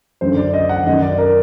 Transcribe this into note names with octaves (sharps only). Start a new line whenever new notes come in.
F#2 D3 C5
D5
D#5
F#5
F#2 D#3 D#5
D5
A#4